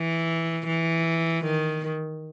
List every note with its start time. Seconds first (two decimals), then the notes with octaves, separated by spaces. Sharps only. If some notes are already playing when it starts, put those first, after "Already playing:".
Already playing: E3
0.67 E3
1.45 D#3